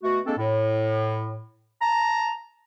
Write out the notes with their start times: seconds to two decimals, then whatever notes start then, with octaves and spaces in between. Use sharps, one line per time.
0.03 B2 A3 F#4
0.26 G#3 A#3 C4 D4 A4
0.38 A2
1.81 A5 A#5